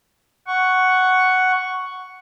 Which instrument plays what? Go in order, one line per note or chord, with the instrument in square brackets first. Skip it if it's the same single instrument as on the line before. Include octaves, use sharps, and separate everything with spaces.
[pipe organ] F#5 C#6